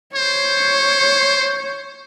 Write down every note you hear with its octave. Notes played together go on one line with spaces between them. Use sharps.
C5 C#5